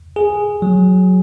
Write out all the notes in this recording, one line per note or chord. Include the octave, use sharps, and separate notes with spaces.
G#4
F#3